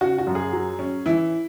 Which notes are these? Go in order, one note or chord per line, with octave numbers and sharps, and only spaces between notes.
C#3 F#4
F#4
F#2
G#4
F#3
C#4
E3 E4